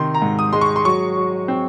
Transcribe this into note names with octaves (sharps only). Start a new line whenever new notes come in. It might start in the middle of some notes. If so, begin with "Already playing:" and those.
Already playing: C3 D#3 C6
A#5
G#2
D#6
G#3 C6
C#6
C6
F#3 C#6
F#3
C4